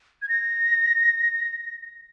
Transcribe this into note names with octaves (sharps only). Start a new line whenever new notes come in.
G#6
A#6